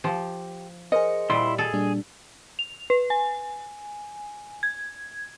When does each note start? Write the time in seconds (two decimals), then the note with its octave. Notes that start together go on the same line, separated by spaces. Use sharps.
0.04 F3 G4
0.92 G#4 A#4 C5 D#5 C#7
1.30 A#2 G3 E4 C6
1.58 G#4 A4
1.73 A#2 G3 D4
2.59 F7
2.90 B4
3.10 G#5
4.63 G#6